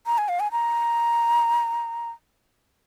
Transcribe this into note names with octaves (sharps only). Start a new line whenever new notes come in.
A#5
G#5
F5
G#5
A#5